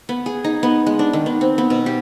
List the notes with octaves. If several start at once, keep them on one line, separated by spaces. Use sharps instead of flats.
B3
G#4
D#4
B3
G#3
D4
D#3
B3
C4
B3
B2
G4